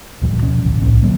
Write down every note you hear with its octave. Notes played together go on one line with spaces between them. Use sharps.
D2 G2 A#2 F3
B2 F3 C#4
A1 D2
C2 A2 C#4
A#2 D3 F#3 A#3